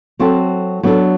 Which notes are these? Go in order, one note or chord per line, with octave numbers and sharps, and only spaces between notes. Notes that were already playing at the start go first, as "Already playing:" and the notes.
F#3 C4 F#4 A4
F#3 B3 D4 A4